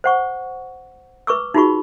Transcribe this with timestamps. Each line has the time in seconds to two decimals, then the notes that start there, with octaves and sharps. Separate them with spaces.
0.04 C5 F#5 C#6
1.27 B4 C#6 D6 E6
1.54 D#4 F4 F#4 G#4 B5 C#6